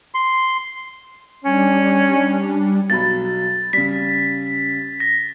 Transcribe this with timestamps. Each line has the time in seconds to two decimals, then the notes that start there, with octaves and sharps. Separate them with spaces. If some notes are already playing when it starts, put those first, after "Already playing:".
0.14 C6
1.44 G3 C#4 D4
2.90 B1 F#3 B5 A6
3.73 C#3 G3 B6
5.00 A#6